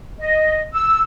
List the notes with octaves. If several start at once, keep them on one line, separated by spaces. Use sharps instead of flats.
D#5
E6